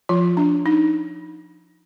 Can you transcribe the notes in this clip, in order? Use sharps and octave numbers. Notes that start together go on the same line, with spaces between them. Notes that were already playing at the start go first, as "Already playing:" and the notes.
F3 F4
D4
D#4